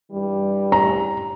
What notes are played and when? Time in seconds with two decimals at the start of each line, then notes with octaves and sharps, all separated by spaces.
0.12 G2 E3 G3
0.72 A#5